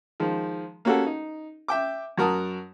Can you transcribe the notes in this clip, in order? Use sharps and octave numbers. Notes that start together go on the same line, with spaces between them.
D#3 F3 G#3
A#3 C#4 F#4 G4 A4
D#4
E5 G5 D6
F#2 F#4 A#4 A5 D#6